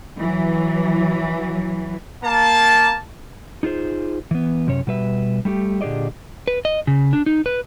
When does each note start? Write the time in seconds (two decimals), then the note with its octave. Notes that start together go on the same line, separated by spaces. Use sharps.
0.18 E3 F#3
2.24 A#3 A5
3.63 D#4 F4 G#4 C5
4.31 E3 B3
4.67 F#2 C3 C#4 C#5
4.87 B2 G3 B4 E5
5.45 G3 A3 F4 G4
5.81 A#2 D3 G4 G#4 D5 D#5
6.48 B4
6.65 D#5
6.87 C#3
7.13 D4
7.26 D#4
7.46 B4